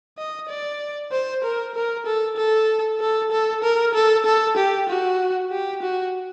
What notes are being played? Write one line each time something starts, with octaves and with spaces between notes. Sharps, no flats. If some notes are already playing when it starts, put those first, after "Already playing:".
D#5
D5
C5
A#4
A#4
A4
A4
A4
A4
A#4
A4
A4
G4
F#4
G4
F#4